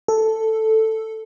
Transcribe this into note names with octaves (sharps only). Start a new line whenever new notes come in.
A4